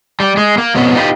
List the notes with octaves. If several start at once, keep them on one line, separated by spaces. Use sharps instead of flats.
G3
G#3
A#3
F2 B2 B3 C#4 B4
D#4 F4 G4 B4